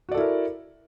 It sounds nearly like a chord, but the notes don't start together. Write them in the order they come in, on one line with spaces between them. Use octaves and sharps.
F#4 D5 A4 E4 A#4